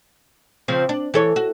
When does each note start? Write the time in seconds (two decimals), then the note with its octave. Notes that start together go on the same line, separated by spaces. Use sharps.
0.68 C#3 F3 C4
0.89 D4
1.14 E3 A4 C#5
1.36 F#4